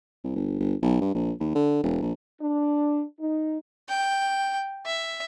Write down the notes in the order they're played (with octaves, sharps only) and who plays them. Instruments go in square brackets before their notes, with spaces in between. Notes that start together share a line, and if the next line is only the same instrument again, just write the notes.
[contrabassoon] C2
G1
G1
B1
G2
A#1
D#2
D3
E1
A#1
[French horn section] D4
D#4
[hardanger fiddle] G5
E5